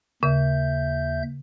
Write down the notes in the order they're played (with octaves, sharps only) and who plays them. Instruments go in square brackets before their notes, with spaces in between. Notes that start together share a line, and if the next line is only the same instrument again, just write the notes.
[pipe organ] D#2 E5 G6 [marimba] C#3